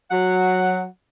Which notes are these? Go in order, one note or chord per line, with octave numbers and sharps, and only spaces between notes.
F#3 F#5